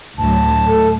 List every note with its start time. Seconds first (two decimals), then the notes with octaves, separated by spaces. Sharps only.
0.18 D2 A2 F#3 A5
0.67 A2 A4